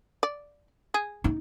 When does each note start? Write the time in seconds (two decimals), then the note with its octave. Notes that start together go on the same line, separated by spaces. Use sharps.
0.23 D5
0.94 G#4
1.24 D#4